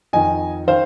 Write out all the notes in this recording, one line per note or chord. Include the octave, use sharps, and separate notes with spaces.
F2 D#3 D#5 G#5
D#3 C5 F5